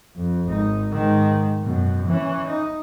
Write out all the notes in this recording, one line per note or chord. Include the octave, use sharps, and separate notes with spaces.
F2
G#1 D#4
G#2 D#3
F#2 B2
E3 C#4
D#4